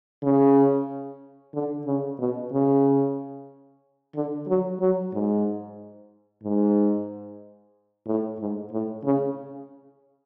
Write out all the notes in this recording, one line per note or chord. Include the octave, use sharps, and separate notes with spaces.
C#3
D3
C#3
B2
C#3
D3
F#3
F#3
G#2
G#2
A2
G#2
A2
C#3